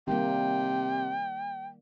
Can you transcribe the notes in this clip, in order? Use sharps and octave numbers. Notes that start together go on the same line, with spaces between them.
C3 D#3 G3 A#3 G5